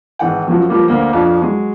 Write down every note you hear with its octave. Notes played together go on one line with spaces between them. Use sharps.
G#1 E3 F#5 G5
F#2 F3 F#3
F3 G3 A#3
D2 A#3 C5
F2 F3 D4
F#3 G#3